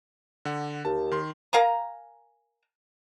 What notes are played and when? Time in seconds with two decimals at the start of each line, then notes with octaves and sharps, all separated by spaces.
0.45 D3 F#5
0.85 D#2 A5
1.11 D#3 C6
1.53 A#4 F5 G#5 A#5